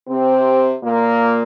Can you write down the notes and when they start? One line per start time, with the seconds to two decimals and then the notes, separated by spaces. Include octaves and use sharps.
0.08 C3 C4
0.82 A#2 A#3